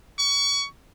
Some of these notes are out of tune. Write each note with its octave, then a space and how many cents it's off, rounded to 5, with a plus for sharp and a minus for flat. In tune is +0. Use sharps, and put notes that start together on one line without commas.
C#6 +25